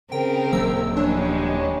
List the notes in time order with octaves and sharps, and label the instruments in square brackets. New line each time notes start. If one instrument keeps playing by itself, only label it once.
[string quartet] C#3 C4 A#4 [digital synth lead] G5
[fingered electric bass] D#1 F#3 A#3 [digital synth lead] E6
[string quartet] F3 G3 G#3 [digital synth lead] D4 [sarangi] C#5